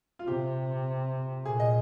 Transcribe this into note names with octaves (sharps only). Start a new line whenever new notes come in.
F4
C3 G4
A#2 G#4
D#5